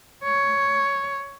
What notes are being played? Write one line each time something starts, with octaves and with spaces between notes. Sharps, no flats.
C#5